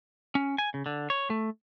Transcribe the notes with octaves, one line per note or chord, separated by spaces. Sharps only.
C#4
G#5
C#3
D3
C#5
A3